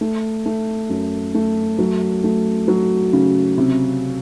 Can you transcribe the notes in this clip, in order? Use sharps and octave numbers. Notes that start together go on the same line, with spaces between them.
A3
A3
F#2
A3
F#3
A3
F#3
C#3
C3